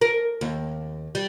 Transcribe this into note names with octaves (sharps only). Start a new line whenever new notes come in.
A#4
D#2
G3